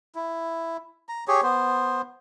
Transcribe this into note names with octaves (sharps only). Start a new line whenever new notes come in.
E4
A#5
G4 G#4 C#5
B3 C5